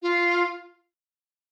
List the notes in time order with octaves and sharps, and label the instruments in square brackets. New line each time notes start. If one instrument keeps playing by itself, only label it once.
[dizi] F4